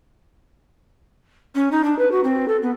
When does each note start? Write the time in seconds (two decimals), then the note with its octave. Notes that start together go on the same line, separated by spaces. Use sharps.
1.55 C#4
1.72 D#4
1.84 D4
1.99 B4
2.12 F#4
2.24 C4
2.48 A4
2.62 B3